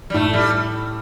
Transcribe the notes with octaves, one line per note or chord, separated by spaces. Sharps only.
G3
A2 A3
G3